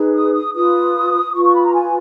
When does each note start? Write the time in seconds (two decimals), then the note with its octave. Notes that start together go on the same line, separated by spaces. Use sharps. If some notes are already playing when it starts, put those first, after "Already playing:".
Already playing: D#4 G#4 B4
0.13 D#6
0.33 D#6
0.54 F4 B4 D#6
1.34 F4 B4 C#6
1.44 C#6
1.54 B5
1.64 A#5
1.74 G#5